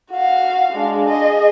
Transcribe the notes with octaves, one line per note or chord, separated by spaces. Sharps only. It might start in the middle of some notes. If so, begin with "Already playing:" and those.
F#4 F5
G#3 D4
G#4 D#5